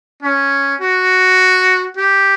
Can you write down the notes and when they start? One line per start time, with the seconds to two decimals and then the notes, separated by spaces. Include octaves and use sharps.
0.22 C#4
0.81 F#4
1.97 G4